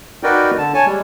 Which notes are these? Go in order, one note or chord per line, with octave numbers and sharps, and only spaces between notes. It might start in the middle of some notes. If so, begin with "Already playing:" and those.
D#4 F#4 A#4 B4 D5 G5
D3 A5
C#5 G#5 A5
G3 G#3